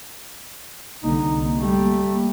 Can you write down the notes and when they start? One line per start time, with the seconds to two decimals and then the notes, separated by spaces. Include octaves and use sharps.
1.04 C2 D3 A#3 D#4
1.58 G3 A3